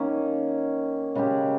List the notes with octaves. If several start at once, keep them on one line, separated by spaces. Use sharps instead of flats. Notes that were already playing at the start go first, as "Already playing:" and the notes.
Already playing: D#3 A#3 C#4
C#3 G#3 C#4 G4